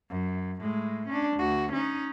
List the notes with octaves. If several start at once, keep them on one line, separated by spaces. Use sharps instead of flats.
F#2
A2 G#3
C#4 D4
D2 F#4
C#4 D#4